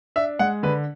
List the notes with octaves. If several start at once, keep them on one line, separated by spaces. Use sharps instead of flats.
D4 E5
G#3 F#5
D3 B4